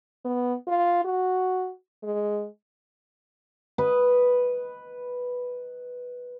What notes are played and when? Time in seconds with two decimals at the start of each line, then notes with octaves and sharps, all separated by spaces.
0.25 B3
0.68 F4
1.05 F#4
2.03 G#3
3.78 B4 D#5